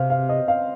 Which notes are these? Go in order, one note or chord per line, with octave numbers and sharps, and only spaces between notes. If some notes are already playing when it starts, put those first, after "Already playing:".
Already playing: C3 C5 F5
F5
D#5
F5